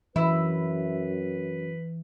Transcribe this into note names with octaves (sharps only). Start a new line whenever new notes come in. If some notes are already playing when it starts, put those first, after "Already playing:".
F#2 E3 E4 B4